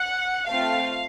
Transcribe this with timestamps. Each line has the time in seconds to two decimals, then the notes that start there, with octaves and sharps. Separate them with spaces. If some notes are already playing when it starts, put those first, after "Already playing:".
Already playing: F#5
0.47 A3 C4 F4 F5